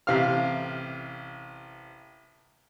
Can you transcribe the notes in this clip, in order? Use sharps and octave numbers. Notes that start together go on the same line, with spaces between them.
A1 C3 F5 F6